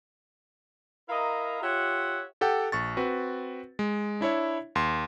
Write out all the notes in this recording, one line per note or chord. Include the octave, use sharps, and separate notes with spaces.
E4 A#4 D#5 F5 A#5
F4 G4 C#5 E5 F#5
G4 A4 F#5 G5
A#1 C#6 A6
C4 F#4 B4
G#3
D4 E4 C#5 E5
D#2 C6